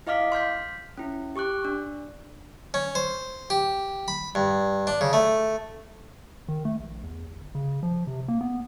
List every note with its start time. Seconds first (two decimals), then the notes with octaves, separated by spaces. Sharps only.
0.07 E4 D#5 F5 D6 F6 B6
0.32 C6 F6 G6 B6
0.97 C#4 E4
1.36 G4 C#6 D6 F#6
1.65 D4
2.74 C#4
2.95 C5
3.50 G4
4.08 B5
4.35 G2
4.87 D4
5.01 C#3
5.13 A3
6.48 D#3
6.65 A3
6.80 A#1
7.04 E2
7.36 G1
7.55 C#3
7.83 F3
8.07 C3
8.28 A#3
8.41 B3